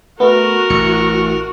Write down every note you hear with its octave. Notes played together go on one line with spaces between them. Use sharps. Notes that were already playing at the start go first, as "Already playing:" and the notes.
A3 B3 F#4 A#4
A1 C#7